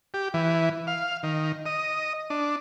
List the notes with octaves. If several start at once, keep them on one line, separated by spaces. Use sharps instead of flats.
G4
E3
F5
D#3
D#5
D4